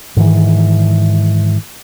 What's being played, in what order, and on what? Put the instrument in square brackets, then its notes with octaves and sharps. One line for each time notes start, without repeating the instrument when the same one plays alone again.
[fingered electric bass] G#2 D#3 E3